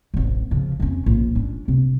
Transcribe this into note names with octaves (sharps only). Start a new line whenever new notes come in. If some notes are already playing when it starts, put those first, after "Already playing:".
D1 A1
C#3 F3
F2 C#4
A#1
C#4 D4
C3